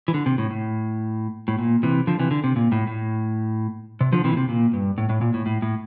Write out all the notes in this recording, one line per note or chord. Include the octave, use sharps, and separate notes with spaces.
E3
D3
C3
A2
A2
A2
A#2
C3 E3
D3 F3
C3 E3
D3
C3
A#2
A2
A2
C3
D3 F3
C3 E3
A#2
C3
A#2
G2
A2
A2
A#2
A2
A2
A2